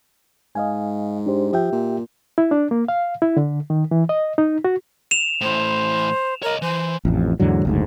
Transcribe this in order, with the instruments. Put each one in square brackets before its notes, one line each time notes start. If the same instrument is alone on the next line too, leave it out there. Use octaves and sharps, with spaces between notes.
[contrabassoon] G#2 [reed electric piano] D#5 F5 G#5
[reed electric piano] D4 G4 C5
[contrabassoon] F3 [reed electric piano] G4 E5 G5
[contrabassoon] A#2
[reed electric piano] E4
D4
A#3
F5
E4
D3
D#3
E3
D#5
D#4
F#4
[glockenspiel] E7 F7
[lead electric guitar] A2 E3 [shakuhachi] C5
[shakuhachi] A#4 [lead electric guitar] C#5 D#5
[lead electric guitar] E3 [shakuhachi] C5
[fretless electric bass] A1 F2
E2 G#2 D3 F#3
F#1 D2 G#2